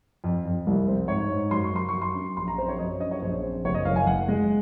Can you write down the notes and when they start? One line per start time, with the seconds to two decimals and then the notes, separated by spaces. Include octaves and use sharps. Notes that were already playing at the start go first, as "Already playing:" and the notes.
0.24 F2
0.45 F2
0.67 C2
0.88 C4
1.08 G#2 C#5
1.29 G#2
1.51 F#2 C6
1.64 C#6
1.73 F#2 C6
1.89 F#2 C#6
2.02 C6
2.15 C#4
2.37 A#1 C6
2.48 A#5
2.58 C4 C5
2.68 C#5
2.79 F#2 D#5
3.00 C#4 D#5
3.11 C#5
3.22 A#1 C5
3.43 C4
3.64 F#1 C#5
3.75 D#5
3.85 F#1 F5
3.96 G#5
4.06 F#1 F#5
4.28 G#3